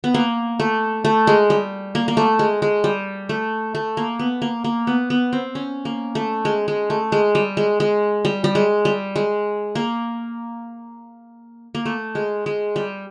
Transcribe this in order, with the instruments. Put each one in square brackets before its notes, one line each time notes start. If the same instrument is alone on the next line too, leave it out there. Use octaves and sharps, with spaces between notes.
[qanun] B3
A#3
A3
A3
G#3
G3
A#3
A#3
A3
G#3
G#3
G3
A3
A3
A#3
B3
A#3
A#3
B3
B3
C4
C#4
A#3
A3
G#3
G#3
A3
G#3
G3
G#3
G#3
G3
G3
G#3
G3
G#3
A#3
A#3
A3
G#3
G#3
G3